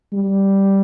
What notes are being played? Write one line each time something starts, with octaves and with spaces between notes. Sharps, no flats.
G3